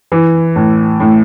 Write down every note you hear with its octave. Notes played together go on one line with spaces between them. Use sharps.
E3
A2
A2